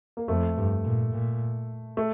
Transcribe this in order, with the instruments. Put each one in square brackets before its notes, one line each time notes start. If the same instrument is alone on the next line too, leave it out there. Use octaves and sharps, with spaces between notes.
[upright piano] A#3
[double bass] F2 [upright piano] A3
[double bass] G2
A#2
A#2
[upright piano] A3